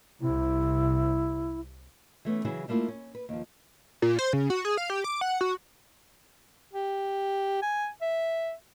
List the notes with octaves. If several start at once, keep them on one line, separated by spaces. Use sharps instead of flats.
C2 C3 E4
E3 A3 B3 C#4
C#3 E3 F#3 E4 F#4 G#4
G3 A3 A#3 E4 F4
C#4
B4
D#2 F3
A#2
C5
C#3
F#4
G#4
F5
G4
D6
F#5
F#4
G4
G#5
E5